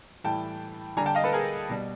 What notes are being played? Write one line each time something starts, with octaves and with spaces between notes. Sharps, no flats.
A2 E3 G3 G5 A5
D3 G3 G#5 A#5
G5 A5
D#5 F5
A4 B4
G#4 A#4
B2 G3